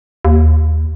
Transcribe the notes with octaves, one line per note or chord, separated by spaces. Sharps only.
D#2